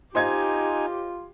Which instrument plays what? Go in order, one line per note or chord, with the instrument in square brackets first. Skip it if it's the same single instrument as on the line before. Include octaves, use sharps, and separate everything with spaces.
[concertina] D#4 G#5 [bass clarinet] F4 [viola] G4 [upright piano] C5 D#5 G#6